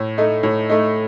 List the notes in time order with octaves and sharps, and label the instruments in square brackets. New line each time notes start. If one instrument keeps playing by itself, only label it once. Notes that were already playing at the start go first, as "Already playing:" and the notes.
Already playing: [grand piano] A2
A3 D#4
A2
A3 D#4